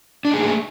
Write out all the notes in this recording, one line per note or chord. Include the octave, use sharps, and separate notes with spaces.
A3 A#3 D4 D#4 G#4